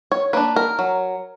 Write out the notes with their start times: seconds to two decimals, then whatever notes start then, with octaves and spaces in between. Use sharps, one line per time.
0.12 C#5
0.33 A#3 D4 B4
0.56 A#4
0.79 F#3